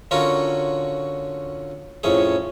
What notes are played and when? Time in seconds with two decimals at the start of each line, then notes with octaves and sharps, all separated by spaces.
0.11 D3 C#4 F4 F#4 A#4
2.03 F2 A2 C#4 G#4